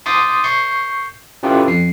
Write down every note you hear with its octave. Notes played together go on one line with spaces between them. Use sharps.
C6 D6 D#6 G6 A6 B6
C#6 G6 C7
C#4 E4 F4 G4 A4 B4
F2 C7